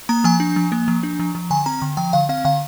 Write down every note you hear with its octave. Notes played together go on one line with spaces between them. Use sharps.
A#3 A#5
F3 G#5
D4
F3
A#3
F3
D4
F3
F3
D3 G#5
C4 A#5
D3
F3 G5
D3 F5
C4 F5
D3 F5